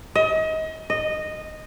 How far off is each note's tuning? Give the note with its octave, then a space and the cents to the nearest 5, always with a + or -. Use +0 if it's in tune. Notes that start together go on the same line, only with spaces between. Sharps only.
D#5 +30
D#5 -10